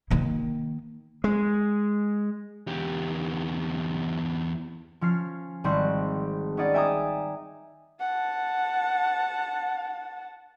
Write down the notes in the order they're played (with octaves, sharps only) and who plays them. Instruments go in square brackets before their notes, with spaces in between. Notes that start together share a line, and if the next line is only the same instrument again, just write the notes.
[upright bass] D#3 A#3
[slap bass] G#3
[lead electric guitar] E2 G4
[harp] F3 C#4 F6 C7
G#1 G3 C4 C6 C#6 F#6
B3 C#4 D#4 G#4 D5 F#5
E5 G5 G#5 A#5 D6 D#6
[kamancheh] F#5 A5